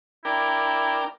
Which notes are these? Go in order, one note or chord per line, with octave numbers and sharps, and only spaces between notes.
D4 E4 A#4 G5